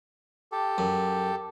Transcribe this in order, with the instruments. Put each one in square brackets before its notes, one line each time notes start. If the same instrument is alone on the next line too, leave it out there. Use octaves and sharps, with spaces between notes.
[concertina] G4 A4
[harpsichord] F#2